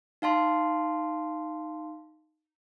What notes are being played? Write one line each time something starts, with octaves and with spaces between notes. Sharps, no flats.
D#4 F5 A5 C6